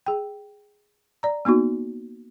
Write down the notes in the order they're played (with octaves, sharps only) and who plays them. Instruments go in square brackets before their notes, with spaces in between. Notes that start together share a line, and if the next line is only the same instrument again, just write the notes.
[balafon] G#4 G5
D5 A#5
A#3 B3 D#4 F#4